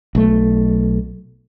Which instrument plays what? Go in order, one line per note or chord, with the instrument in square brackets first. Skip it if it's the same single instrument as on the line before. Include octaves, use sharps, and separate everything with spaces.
[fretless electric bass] B1 A3